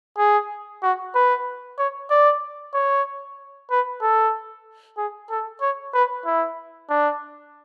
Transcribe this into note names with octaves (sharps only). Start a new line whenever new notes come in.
G#4
F#4
B4
C#5
D5
C#5
B4
A4
G#4
A4
C#5
B4
E4
D4